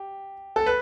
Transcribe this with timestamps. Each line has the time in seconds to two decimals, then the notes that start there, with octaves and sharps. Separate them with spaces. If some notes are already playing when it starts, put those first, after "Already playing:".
Already playing: G4
0.56 A4
0.66 B4